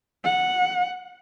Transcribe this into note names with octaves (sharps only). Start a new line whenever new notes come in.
F#5